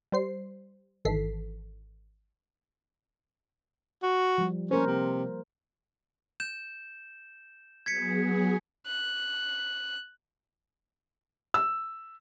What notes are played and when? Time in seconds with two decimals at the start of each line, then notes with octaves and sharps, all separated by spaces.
0.12 G3 C5 C7
1.05 G#1 D#3 E3 A4 B6 C7
4.03 F#4
4.38 F3 G3
4.71 A#3 C#4 A#4 C5
4.87 C3
6.40 G6 E7
7.86 F#3 B3 G#4 G#6 B6 C#7
8.87 F#6
11.54 E6